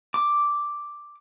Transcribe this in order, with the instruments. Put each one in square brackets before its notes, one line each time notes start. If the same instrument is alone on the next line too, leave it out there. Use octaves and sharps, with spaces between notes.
[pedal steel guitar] D6